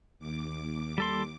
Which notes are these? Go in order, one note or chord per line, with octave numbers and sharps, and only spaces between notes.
D#2 D6
G3 A4 C6